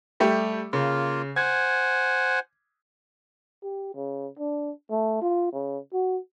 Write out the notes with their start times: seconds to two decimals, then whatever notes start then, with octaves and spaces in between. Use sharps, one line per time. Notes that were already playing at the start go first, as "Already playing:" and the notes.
0.20 G3 A3 G4
0.73 C#3 A#3 F4
1.36 C5 F#5 G#5 G#6
3.63 G4
3.95 C#3
4.39 D4
4.90 A3
5.21 F4
5.53 C#3
5.93 F#4